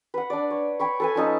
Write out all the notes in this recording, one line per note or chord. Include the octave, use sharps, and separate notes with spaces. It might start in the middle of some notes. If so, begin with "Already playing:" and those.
B4 F#5
D4 D5
C#5
C#5 G5 B5 C#6
A4 B4 G#5
F3 C#4 D#4 A4